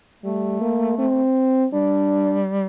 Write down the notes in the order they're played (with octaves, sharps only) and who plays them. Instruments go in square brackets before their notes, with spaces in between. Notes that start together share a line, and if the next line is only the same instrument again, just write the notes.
[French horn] G3 [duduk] A3
[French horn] A#3
C4
[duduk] G3 [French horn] D4